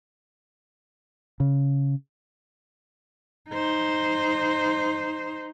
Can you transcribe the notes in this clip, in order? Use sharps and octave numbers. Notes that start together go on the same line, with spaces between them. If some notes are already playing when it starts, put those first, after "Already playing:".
C#3
D#4 C5